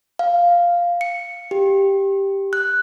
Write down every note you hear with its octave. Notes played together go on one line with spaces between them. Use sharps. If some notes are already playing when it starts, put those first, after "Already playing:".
F5
C#7
G4
F#6